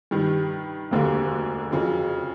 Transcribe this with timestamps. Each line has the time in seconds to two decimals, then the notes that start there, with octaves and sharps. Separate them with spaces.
0.11 G2 D#3 G3
0.91 E1 D2 D3 G3 A#3
1.72 F2 C#3 F#3